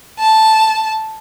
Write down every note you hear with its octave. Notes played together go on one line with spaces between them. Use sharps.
A5